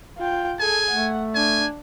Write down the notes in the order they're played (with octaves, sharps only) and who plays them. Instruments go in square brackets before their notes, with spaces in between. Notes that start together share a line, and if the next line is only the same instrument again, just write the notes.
[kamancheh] F4 G5
[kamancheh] G#4 A4 [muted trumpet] G#5
[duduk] A3 [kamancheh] F#5
[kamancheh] D4 [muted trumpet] G#5